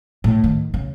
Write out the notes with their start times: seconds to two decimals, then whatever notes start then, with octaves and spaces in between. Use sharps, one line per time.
0.24 A2
0.44 D#3
0.74 C#3